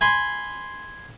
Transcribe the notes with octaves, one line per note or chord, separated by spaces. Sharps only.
G#5 B5 C6